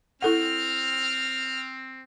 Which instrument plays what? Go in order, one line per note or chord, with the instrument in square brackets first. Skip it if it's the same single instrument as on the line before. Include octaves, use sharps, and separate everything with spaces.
[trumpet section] C4 [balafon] E4 A4 F#5 [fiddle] F6